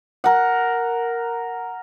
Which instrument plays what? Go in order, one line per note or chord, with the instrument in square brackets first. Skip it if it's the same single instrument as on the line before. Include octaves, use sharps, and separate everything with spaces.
[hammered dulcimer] A#4 F#5